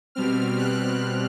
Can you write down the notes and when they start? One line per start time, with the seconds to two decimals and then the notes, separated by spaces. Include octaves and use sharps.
0.15 B2 G3 C4 F6
0.58 F#6